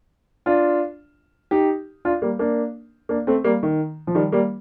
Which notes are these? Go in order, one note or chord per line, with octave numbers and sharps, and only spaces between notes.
D4 F4
D#4 G4
D4 F4
G3 A#3
A#3 D4
A#3 D4
A3 C4
G3 A#3
D#3
F3
D#3 G3
G3 A#3